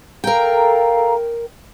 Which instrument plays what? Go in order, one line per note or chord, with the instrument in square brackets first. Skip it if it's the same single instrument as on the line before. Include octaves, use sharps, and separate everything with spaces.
[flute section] A4 F5 A#5 [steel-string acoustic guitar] A#4 G5